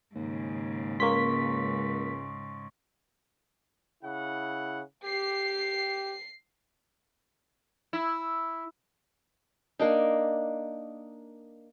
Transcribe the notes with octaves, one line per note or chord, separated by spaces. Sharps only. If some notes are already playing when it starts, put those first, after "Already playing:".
D#2 G#2 C#3
C#2 A#3 C6 C#6 B6
C#3 E4 F#5
G4 C7
E4
A#3 D4 D#4